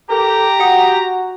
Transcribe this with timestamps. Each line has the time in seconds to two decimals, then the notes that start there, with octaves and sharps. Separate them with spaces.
0.10 G4 A4 A#4 A#5
0.60 F#4 F#5 D#6